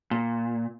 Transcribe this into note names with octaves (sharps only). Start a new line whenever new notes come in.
A#2